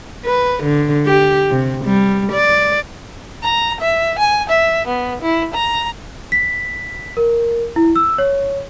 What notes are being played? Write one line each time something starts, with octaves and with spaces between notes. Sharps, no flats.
B4
D3
G4
C3
G3
D5
A#5
E5
G#5
E5
B3
E4
A#5
B6
A#4
E4
E6
C#5